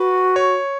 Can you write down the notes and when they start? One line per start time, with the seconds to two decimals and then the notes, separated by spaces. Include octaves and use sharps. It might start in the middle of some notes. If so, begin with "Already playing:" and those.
Already playing: F#4 B4
0.36 C#5